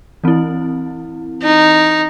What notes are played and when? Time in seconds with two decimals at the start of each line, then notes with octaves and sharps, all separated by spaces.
0.24 E3 C4 E4
1.43 D#4